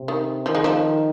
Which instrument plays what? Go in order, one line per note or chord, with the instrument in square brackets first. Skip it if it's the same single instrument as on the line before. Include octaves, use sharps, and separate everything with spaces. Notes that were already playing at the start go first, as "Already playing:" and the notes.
Already playing: [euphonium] C3
[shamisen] D#3
[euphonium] D#3 [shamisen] F3
[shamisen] G#3
F3